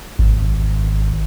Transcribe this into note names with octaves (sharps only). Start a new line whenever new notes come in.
G#1